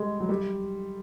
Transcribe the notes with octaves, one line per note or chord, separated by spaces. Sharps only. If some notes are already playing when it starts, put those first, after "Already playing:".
Already playing: G3 G#3
F#3
G3